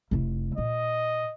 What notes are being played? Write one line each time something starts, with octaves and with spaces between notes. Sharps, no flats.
F1 E4
A#2 D#5